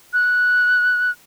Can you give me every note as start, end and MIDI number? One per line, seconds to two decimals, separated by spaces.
0.13 1.11 90